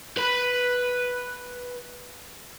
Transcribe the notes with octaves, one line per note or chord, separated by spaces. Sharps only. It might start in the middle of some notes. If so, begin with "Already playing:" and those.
B4 B5